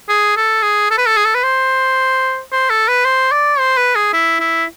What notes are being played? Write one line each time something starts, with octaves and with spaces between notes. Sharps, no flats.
G#4
A4
G#4
A4
B4
A4
G#4
A4
B4
C5
C5
A4
B4
C5
D5
C5
B4
G#4
E4
E4